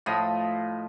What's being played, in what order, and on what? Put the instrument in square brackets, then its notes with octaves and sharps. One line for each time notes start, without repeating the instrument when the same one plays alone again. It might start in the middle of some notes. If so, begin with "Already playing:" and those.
[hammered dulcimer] A2 F3 D#5 B5